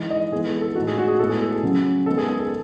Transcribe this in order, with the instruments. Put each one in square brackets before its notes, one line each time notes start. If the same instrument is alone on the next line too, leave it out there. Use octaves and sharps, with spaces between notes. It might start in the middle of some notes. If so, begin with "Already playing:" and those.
Already playing: [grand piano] E3 G#3 D#4
D#5
E3 G#3 B3 G#4
A4
A4
A2 G#3 D#4 F#4
G#4
F#4
G#4
A2 G#3 B3 E4 A4
G#4
A4
G#4
C#3 F#3 C#4
D#3 G#3 B3 A4
G#4
G#4
A4